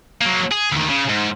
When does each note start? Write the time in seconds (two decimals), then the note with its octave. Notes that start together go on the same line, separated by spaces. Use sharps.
0.21 F#3 A#3
0.51 G#4
0.72 D2 D#3
0.89 C#3
1.09 G#2